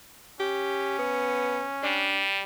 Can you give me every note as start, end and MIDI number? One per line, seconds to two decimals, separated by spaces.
0.40 2.16 61
0.40 0.97 67
0.99 1.64 59
1.83 2.43 55
1.83 2.23 62